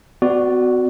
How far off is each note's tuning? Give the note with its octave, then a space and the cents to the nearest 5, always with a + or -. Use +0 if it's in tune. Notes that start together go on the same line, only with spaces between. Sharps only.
B3 +40 F#4 +0 D5 +0